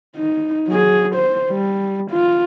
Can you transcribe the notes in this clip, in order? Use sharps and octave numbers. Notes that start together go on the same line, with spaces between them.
D#4
F#3 G#4
C5
G3
F4